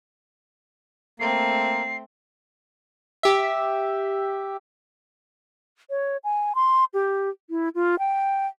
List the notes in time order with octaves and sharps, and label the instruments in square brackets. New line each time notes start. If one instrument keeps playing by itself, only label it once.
[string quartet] A3 C4 [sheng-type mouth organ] A#3 [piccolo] C7
[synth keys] G4 E5
[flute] C#5
G#5
C6
G4
E4
F4
G5